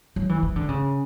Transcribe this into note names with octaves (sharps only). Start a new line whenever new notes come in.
F#3
E3
E3
D3
C#3